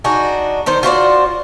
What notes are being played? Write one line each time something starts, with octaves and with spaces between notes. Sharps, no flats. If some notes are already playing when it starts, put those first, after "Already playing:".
D4 D#4 F#4 G#4
D#3 D#4 C5
F4 F#4 C5 D5